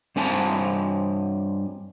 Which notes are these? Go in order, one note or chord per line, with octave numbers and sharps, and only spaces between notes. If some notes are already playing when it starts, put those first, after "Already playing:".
G2 C4 G#5 A5